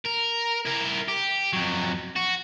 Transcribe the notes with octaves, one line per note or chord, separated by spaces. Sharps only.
A#4
E4 A#4
G4
F2 F#3
F#4